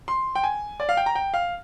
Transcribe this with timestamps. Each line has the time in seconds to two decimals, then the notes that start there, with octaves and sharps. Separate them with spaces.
0.08 C6
0.35 G5
0.43 G#5
0.80 D5
0.89 F5
0.97 G5
1.06 A#5
1.15 G5
1.34 F5